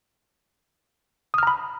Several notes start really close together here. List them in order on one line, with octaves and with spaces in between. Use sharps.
D#6 F6 A#5 B5